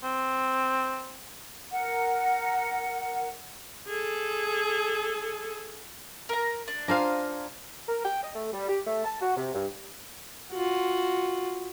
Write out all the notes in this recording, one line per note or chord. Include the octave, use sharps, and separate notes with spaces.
C4
A#4 F#5
G#4 A4
A#4 A#5
D4
D4 F4 C5 F5 G#5 A#5
A#4
G5
D#5
A3
G3
G4
A3
A5
F#4
C3
G2
F4 F#4